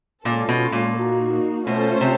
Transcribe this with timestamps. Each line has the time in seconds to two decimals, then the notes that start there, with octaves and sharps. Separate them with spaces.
0.25 A#2 G#3 C#4 F4 A4
0.49 B2
0.72 A#2
0.96 A#3 D#4 F#4
1.66 B2 A3 C#4 F4 A4 C5
2.01 C3